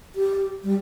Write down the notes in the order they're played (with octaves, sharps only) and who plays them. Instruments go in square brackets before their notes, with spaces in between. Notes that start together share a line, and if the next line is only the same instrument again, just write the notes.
[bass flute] G4
G3